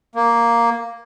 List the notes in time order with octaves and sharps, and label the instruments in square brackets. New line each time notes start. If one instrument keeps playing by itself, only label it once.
[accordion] A#3